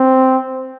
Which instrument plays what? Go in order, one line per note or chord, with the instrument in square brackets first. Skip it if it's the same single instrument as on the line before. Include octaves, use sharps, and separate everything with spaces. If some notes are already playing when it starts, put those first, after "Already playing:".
Already playing: [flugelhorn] C4